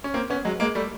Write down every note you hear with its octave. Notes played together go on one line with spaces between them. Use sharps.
C#4
A#3 C4
B3 C#4
F#3 G#3
G#3 A#3
G3 A3